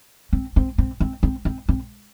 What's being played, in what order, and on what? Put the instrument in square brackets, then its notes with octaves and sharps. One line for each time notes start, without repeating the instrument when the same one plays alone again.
[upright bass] C4
C4
C4
C4
C4
C4
C4